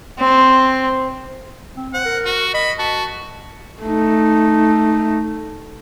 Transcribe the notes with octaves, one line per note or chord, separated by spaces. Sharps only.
C4
C4
C5 F#5
A#4
F#4
D#5 B5
F#4 A5
A3 D#4